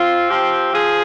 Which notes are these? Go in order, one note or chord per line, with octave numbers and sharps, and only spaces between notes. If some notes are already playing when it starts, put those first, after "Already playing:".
Already playing: C4 F4
F3 G4
F3 G#4